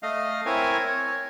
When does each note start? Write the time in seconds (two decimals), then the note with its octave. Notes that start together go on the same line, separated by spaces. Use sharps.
0.03 A3 D#5 F5
0.46 C4 E4 A#4 C#5 G#5
0.87 C#5